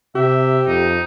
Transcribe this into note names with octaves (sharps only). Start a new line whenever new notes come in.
C3 G4 E5
F2 D#4